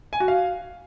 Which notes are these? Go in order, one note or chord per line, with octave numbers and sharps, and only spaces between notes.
G#5
F#4
F5